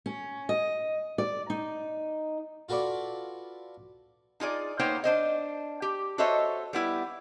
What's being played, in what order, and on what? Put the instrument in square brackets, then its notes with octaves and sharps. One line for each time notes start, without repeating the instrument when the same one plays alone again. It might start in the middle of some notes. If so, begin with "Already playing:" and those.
[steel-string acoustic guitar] C#4
D#5
D5
D#4
[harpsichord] F4 F#4 A4 B4 D5
[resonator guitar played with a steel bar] D#4 F4 G#4 D5
A#3 B3 D#4 C5 C#5 G5
D4 C5 D#5
G4
F#4 A4 C5 C#5 D#5 E5
G3 B3 E4